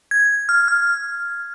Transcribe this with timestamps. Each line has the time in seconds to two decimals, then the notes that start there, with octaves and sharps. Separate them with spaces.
0.11 G#6
0.49 F6
0.68 F6